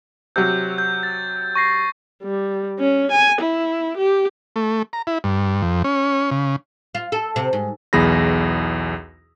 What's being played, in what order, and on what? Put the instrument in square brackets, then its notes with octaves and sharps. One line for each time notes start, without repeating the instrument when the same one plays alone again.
[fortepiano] C3 F#3 [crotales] G6
[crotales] G6
A6
C#6 A#6 C7
[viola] G3
C#4
G#5
E4
G4
[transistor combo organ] A3
A#5
E4
G2
F2
C#4
C#3
[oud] F4
A4
C3
G#2
[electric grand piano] B1 E2 G#4 B5 A#6